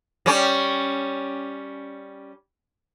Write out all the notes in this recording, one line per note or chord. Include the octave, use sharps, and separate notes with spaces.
G3 C#4